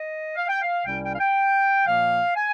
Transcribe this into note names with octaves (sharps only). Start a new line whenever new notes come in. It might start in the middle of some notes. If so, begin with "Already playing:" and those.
Already playing: D#5
F5
G5
F5
C2 C3 G3 C#4 G5
G5
F5
G5
A#2 F3 A#3 F5
G#5